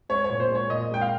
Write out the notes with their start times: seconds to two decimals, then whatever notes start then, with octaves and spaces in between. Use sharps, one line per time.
0.09 G#3 C#5
0.24 C#5
0.30 A#2
0.40 C5
0.50 G#3 C#5
0.70 A#2 D#5
0.91 G#3 G5
1.01 F5